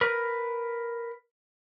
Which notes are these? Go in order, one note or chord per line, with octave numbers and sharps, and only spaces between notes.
A#4 B4